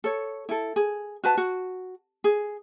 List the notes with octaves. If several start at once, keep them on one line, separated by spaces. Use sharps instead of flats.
A4 C#5
E4 A4
G#4
F#4 B4 A5
F#4
G#4